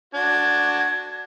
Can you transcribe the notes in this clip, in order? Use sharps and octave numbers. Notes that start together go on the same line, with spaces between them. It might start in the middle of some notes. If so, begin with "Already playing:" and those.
D4 F#4 G#6